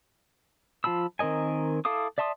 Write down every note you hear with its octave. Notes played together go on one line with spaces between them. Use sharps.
F3 F4 A5 B5 E6
D#3 C4 A#4 D#5 G#5
E4 A4 F5 D6 D#6
D5 E5 A5 C6 D#6